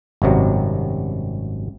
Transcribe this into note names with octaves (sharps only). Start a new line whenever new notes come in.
G#1 F#2 C3 F#3 G3